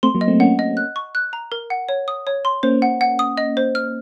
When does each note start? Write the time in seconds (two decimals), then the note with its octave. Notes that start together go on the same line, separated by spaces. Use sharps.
0.03 A3 C4 C6
0.15 F#3 A#3
0.21 D#5
0.28 A3 C4
0.40 A#3 C#4 F#5
0.59 D#5
0.77 F#6
0.96 C#6
1.15 F#6
1.33 A#5
1.52 A#4
1.70 F#5
1.89 C#5
2.08 D#6
2.27 C#5
2.45 C6
2.63 A#3 C#4 C5
2.82 F#5
3.01 F#5
3.19 D#6
3.37 D#5
3.57 C5
3.75 F6